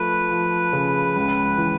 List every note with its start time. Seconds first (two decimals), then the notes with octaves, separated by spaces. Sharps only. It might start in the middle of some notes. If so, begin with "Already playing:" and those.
Already playing: F3 A3 B4
0.31 F3
0.73 C#3
1.16 C#2
1.58 E3